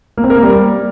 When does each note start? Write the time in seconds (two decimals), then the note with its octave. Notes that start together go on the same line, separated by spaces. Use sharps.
0.18 A#3
0.24 C4
0.30 A#4
0.36 A#3
0.43 G3